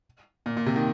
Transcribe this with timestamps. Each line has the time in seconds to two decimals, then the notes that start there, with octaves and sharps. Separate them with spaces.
0.46 A#2
0.57 A#2
0.66 C3
0.76 D#3